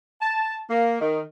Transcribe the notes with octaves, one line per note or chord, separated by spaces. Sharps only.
A5
A#3
D#3